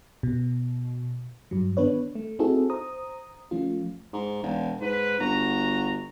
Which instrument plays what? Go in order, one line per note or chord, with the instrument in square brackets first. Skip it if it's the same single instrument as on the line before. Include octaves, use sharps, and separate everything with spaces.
[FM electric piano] B2
G2 F#3
D#3 B3 D4 B4 C#5
A3
C4 D#4 E4 F#4 G#4 A4
C5 A#5 D#6
F3 A3 C#4 F4
[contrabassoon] G#2
E1
[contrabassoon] G#2 [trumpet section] B4
[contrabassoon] G1 [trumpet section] F#4 A#5